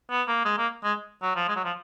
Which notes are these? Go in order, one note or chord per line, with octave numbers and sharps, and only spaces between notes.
B3
A#3
G#3
A#3
G#3
F#3
F3
G#3
F#3
F3